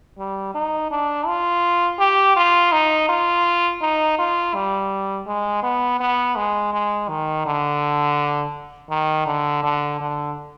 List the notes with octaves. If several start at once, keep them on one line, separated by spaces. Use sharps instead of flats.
G3
D#4
D4
F4
G4
F4
D#4
F4
D#4
F4
G3
G#3
B3
B3
G#3
G#3
D#3
D3
D#3
D3
D3
D3